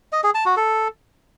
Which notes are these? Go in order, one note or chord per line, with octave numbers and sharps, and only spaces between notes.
D#5
G#4
A5
F#4
A4